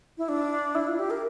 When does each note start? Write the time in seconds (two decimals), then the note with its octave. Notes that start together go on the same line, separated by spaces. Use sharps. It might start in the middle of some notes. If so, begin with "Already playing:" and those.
0.18 E4
0.29 D4
0.75 E4
0.87 F4
0.99 G4
1.10 A#4